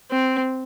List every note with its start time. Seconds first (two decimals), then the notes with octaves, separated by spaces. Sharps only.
0.11 C4